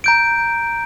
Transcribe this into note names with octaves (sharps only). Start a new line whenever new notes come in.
A#5 G6 D7